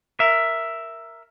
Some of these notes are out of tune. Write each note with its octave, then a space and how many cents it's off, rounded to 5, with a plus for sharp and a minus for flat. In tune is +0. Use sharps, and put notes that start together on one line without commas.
A#4 +0 E5 +5